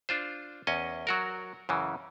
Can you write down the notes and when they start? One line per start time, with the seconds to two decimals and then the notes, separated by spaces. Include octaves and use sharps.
0.09 D4 F4 C5
0.67 E2 C#4 D#5
1.07 F#3 F#4 A#4
1.69 F#2 C#3 E3